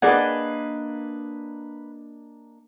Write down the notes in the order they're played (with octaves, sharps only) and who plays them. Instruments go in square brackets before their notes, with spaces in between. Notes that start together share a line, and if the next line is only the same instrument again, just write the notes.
[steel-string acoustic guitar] A#3 D4 D#5 [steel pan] G#4 D5 F#5 [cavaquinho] B4 G#5